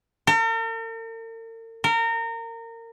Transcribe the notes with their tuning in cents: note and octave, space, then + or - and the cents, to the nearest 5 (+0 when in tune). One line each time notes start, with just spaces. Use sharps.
A#4 -45
A#4 -25